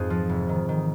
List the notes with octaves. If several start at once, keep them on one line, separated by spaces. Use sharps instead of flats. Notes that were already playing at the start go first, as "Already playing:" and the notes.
Already playing: F2 G#2 C4 F4 G#4 C5
F3
F1
D#3
D#3